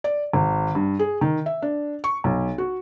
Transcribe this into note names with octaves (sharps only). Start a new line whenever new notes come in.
D5
G#1
G2
G#4
D#3
E5
D4
C#6
B1
F#4